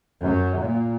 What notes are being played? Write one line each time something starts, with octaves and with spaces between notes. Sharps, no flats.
F#2
A#2